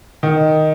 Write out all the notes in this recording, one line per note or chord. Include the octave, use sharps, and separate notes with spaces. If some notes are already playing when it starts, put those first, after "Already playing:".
D#3